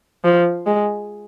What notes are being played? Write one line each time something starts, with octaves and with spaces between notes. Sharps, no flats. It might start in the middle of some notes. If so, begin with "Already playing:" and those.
F3
G#3